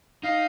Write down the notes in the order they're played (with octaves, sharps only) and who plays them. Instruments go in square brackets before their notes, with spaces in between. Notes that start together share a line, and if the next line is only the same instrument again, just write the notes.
[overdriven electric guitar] D#4 [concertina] F5